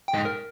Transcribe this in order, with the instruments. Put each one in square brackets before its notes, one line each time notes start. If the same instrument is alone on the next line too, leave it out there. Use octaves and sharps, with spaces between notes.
[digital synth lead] G5
[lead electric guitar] G#2
[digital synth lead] A#4